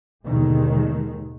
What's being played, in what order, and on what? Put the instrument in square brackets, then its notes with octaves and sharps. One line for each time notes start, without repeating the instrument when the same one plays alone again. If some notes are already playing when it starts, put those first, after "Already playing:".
[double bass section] D#2 G#2 B2 D3 D#3 G#3